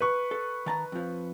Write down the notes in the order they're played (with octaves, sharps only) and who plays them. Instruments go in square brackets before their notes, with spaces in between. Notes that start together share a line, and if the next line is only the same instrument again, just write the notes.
[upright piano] B4 C#6
[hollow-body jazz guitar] A4
D#3 A5 A#5
F2 F3